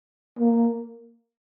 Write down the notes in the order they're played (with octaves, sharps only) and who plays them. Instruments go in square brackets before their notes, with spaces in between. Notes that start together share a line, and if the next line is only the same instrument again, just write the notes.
[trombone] A#3